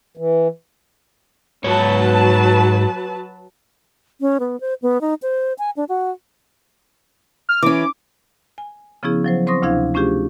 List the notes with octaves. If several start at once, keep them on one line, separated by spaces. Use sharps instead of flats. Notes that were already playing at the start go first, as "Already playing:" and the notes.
E3
G#2 F#3 B4 C#5 A5
C#4
B3
C5
B3
D#4
C5
G#5
D4
F#4
F6
E3 C#4 D6
G#5
C#3 F3 B3 C#4 E4 G#4
F3 F#3 C5
C4 C5 C6 C#6 D#6 A#6
D2 C3 D4 E4 F5 G#6
A3 C#4 D4 F4 G4 G#4